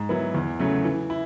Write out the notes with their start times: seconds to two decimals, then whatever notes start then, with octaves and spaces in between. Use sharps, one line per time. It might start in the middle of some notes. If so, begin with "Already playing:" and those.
Already playing: G#2
0.09 F#3 B3 E4
0.34 E2
0.59 C#3 F#3 A3
0.85 E3
1.10 E4